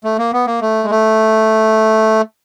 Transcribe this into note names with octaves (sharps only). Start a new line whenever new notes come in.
A3
A#3
B3
A#3
A3
G#3
A3